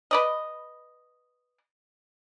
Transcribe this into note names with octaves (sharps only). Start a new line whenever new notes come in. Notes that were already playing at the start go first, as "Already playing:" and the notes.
B4 D5 D#5